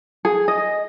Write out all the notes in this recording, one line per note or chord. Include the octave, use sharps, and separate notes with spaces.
G#4
D#5